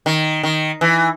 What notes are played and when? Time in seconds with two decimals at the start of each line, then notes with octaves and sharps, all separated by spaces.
0.06 D#3
0.43 D#3
0.81 E3